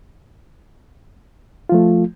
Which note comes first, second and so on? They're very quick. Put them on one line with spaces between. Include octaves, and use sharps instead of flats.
F4 F3 A3